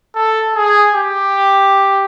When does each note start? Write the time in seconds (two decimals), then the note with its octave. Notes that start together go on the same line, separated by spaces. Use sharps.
0.15 A4
0.55 G#4
0.95 G4